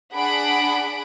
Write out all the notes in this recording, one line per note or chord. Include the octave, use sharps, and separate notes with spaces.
D4 G#4 F#5 B5 D7